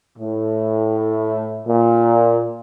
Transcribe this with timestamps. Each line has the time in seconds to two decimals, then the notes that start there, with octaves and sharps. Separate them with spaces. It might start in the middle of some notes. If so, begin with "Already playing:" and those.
0.18 A2
1.68 A#2